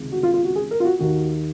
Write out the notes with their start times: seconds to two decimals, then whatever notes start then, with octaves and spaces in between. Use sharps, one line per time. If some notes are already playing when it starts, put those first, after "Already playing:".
Already playing: C#2 C3 D#3
0.12 F#4
0.23 F4
0.34 F4
0.44 F#4
0.56 G#4
0.71 A#4
0.80 F4
0.85 F#4
0.99 D#2 D#3 F#4